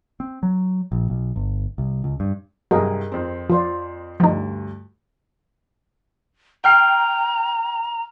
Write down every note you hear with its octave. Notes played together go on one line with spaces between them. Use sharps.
C4
F#3
A#1
B1
G1
C2
C#2
G2
C2 G2 F#3 G#4 A#4 D#5
F2 C4
F3 F4 C5 D5
D2 G2 F3 D#4
G5 A#5 F6 C7